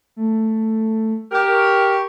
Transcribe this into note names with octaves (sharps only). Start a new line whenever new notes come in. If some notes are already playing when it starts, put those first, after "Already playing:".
A3
G4 A#4
C#6